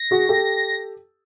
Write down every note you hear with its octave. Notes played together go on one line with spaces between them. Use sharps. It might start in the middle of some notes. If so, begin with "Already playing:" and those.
Already playing: A#6
F#4 G#4
G4 A4